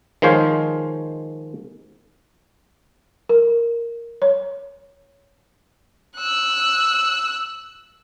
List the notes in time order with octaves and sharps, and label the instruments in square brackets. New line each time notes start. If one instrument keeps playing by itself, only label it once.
[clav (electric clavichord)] D#3 F3 G#3 C5 C#5 F5
[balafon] A#4
C#5
[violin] E6 F#6